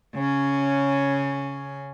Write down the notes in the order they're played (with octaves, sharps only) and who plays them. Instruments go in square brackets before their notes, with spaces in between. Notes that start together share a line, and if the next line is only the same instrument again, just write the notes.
[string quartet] C#3 C#4